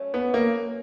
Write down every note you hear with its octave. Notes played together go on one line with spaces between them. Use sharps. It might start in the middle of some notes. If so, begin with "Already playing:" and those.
Already playing: F#3 A3 C#4
B3
A#3